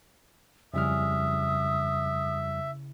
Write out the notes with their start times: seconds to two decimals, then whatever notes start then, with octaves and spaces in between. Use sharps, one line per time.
0.74 F2 C#3 G3 E4 E5 D#6 F6